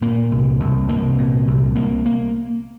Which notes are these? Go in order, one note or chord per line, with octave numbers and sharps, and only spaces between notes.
A#2 A#3
C2
C2
C2 A#3
A#2
C2
C2 A#3
A#3